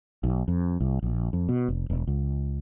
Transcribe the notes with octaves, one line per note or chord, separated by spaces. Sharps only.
B1
F2
C2
A#1
F2
B2
F1
E1
C#2